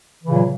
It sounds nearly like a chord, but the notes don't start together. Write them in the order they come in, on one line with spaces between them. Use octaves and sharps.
E3 C#3 A#2 F#3